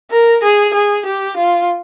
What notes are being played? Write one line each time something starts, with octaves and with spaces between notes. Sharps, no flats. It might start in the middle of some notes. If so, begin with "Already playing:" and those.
A#4
G#4
G#4
G4
F4